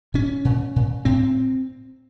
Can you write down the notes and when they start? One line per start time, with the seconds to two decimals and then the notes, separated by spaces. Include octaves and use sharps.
0.14 A#2 C#4
0.45 A#2
0.76 A#2
1.05 A2 C4